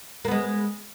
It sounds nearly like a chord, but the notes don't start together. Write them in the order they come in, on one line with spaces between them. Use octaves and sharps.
A#3 B3 G#3